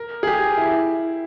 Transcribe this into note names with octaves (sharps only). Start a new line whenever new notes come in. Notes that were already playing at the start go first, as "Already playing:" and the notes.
Already playing: A#4
G#4
G4
E4